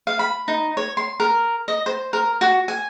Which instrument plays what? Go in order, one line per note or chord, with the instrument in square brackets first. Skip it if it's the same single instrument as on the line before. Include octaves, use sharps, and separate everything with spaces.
[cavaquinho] F5
B5
D#4
C#5
C6
A#4
D#5
C5
A#4
F#4
G#5